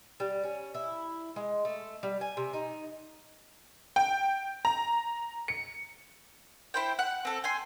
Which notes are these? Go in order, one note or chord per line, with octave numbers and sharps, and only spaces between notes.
G3
C#4
E4
G#3
A3
G3
G#5
C3
D#4
G5
A#5
C#7
E4 C5 G5
F#5
C4 A4
G5 G#5 C6